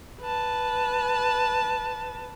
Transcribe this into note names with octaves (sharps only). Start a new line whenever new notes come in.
B4 A5